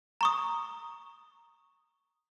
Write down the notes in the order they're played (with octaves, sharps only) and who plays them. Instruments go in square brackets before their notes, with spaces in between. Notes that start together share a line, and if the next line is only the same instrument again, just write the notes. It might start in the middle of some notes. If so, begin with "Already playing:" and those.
[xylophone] A#5 C#6 D#6